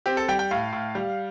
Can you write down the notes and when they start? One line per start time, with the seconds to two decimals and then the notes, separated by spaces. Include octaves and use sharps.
0.06 C4 G4
0.17 A4
0.28 G3 G5
0.39 G5
0.51 A2 F5
0.73 A2
0.95 G3